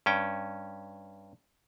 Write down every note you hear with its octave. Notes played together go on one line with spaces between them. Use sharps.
G2 C#4 G5